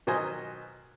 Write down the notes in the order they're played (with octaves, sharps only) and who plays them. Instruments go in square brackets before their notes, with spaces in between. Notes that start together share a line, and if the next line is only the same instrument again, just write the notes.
[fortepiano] B2 D#3 F#3 C5 D#5 G#5